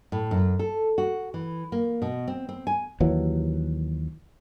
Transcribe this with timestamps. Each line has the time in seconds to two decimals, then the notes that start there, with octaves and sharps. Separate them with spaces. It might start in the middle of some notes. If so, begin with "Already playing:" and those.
0.12 A2
0.31 F#2
0.59 A4
0.98 F#4
1.34 E3
1.72 A#3
2.02 B2
2.28 C4
2.49 C4
2.67 G#5
3.00 D#2 E3 F#3